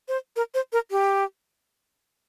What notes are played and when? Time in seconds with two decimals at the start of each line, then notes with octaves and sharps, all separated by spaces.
0.08 C5
0.36 A#4
0.54 C5
0.72 A#4
0.91 G4